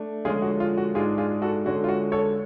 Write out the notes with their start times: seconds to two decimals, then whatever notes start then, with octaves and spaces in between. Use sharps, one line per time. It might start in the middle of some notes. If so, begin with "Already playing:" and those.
Already playing: A3 D4
0.25 D3 F3 G#3 C#4 F4 G#4
0.42 F#4
0.60 F4
0.77 F#4
0.94 G#2 G#3 D4 F4 G#4
1.18 F4 G#4
1.42 F#4 A4
1.66 D3 G#3 C#4 F#4
1.84 F4
1.88 F#4
2.12 A4 C#5